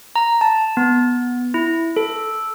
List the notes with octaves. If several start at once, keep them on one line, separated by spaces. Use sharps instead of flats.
A#5
A5
B3
E4
A4